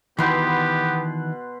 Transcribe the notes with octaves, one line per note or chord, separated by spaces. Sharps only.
B2 D#3 E3 B3 G4 B4 C6